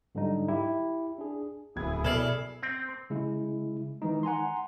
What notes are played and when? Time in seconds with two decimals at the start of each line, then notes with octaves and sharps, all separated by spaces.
0.15 G#2 D3 F#3 G3 D#4
0.48 E4 G4
1.18 D4 G#4
1.76 D1 F#2 E4 G#4 G#6
2.05 B2 A4 D5 F6 G#6 C7
2.63 C4
3.10 C#3 G#3 E4
4.02 D#3 E3 G#3 D#4
4.23 F#5 G#5 A#5 C6